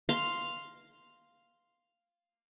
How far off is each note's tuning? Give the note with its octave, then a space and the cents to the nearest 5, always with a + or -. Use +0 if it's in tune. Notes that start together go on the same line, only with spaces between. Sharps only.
F5 +0 C6 +0